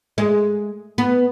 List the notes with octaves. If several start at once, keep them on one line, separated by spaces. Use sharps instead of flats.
G#3
B3